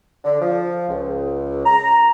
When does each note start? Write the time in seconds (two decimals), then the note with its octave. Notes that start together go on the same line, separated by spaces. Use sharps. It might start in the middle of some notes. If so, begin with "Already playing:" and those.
0.24 D3
0.41 F3
0.88 C#2
1.65 A#5